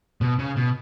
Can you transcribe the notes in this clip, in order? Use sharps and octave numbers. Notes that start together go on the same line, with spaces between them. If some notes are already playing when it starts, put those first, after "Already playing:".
B2
C#3
B2